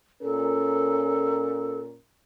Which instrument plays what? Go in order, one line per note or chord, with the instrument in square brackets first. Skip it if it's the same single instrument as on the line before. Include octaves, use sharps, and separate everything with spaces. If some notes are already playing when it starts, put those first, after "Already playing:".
[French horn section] A#2 C#4 A#4 [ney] A4